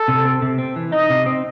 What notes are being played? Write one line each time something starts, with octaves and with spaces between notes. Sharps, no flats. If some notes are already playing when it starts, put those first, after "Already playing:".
Already playing: A4
C3
C4
C3
C4
E3
D#4 D#5
C3
C4